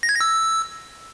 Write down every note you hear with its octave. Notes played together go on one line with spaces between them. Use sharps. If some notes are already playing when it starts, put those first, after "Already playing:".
A#6
G#6
A#6
E6